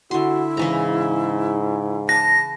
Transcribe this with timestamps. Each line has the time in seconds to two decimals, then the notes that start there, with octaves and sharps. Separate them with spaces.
0.11 D3 E4 F#4 C6
0.57 G#2 C#3 E3 A#5
2.09 B4 A5 A#6